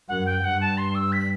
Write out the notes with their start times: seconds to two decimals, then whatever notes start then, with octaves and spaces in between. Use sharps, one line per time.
0.08 F#2 F#5
0.26 G5
0.43 G2 F#5
0.61 A5
0.78 C6
0.95 E6
1.12 B6